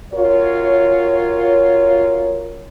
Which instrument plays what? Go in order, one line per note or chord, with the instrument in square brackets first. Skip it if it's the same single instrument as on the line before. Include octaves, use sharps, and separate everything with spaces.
[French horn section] F#2 F4 A#4 C#5